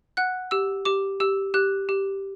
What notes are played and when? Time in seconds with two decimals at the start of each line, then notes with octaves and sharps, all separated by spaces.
0.17 F#5 F#6
0.51 G4 E6
0.85 G4 D6
1.20 G4 E6
1.54 G4 F#6
1.89 G4